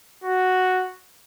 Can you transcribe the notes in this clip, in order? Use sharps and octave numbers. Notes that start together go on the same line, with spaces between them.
F#4